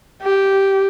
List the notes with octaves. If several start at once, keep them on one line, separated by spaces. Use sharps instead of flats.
G4